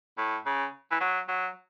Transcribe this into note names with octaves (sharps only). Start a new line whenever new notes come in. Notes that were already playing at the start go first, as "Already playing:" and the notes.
A2
C#3
E3
F#3
F#3